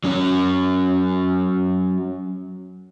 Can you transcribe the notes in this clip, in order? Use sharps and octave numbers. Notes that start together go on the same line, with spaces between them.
F#3 C#4 C#5